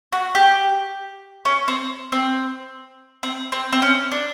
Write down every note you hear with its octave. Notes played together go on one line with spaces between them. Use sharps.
F#4
G4
C#4
C4
C4
C4
C4
C4
C#4
D4